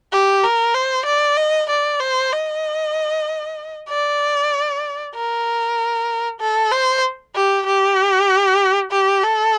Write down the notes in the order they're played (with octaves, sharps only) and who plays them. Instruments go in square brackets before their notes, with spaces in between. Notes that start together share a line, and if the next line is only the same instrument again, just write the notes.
[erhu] G4
A#4
C5
D5
D#5
D5
C5
D#5
D5
A#4
A4
C5
G4
G4
G4
A4